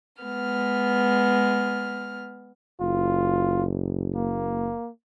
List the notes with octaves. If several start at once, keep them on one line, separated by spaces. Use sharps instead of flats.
G#3 B3 F6
F#1 F4
A#3